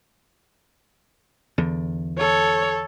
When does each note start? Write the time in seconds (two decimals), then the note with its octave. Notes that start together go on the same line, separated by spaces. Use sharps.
1.58 E2 D3
2.19 A4 C#5